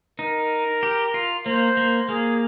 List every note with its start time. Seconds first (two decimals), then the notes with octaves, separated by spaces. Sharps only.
0.19 D#4 A#4
0.83 G4
1.14 F4
1.46 A#3 C5
1.77 A#3
2.08 A#3 G#4